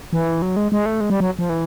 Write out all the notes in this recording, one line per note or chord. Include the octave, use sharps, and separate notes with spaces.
E3
F#3
G#3
G#3
A3
G#3
G3
F#3
F3
E3